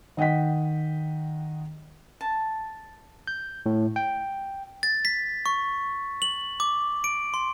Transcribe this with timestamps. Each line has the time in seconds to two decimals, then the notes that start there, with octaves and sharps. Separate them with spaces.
0.17 D#3 D#5 F#5 G5 B6
2.21 A5
3.27 G6
3.66 A2
3.96 G5
4.83 A6
5.05 B6
5.46 C#6
6.22 F#7
6.60 D6
7.04 D7
7.34 C6